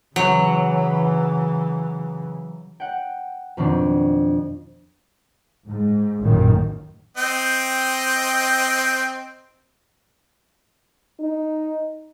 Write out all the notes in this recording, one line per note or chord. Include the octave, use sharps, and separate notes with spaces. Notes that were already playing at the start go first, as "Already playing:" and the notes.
C#3 E3 F#3
F#5 G5
F2 B2 D#3 C4 D4
G#2
A1 F#2 A#2 D#3
C4 D#5 G5
D#4